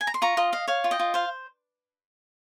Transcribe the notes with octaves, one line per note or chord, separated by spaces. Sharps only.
G#5
A#5
C6
F4 A#5 C#6
F4 D#5
D#5 F5
C#5 F5
F4
D#5 G5
F4
C5 F5